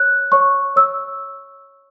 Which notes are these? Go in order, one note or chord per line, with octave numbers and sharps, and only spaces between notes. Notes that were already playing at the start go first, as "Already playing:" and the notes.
Already playing: C#5 F#6
C#5 C#6
C#5 E6